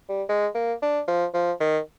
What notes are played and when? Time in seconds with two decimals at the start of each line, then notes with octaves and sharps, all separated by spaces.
0.09 G3
0.29 G#3
0.55 A#3
0.82 D4
1.08 F3
1.34 F3
1.60 D#3